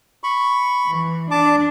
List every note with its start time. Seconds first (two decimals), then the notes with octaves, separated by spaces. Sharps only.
0.23 B5 C#6
0.89 E3
1.31 D4 A5 D6